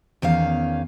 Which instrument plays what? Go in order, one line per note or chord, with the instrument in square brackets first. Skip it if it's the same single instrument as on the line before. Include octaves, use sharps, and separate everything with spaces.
[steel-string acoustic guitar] E2 D#3 C#4 F5